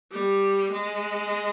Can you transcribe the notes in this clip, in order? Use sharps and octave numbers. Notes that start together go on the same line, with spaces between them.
G3
G#3